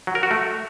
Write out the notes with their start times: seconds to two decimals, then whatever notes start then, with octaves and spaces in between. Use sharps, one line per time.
0.07 F#3
0.15 A#4
0.23 F#4
0.31 A3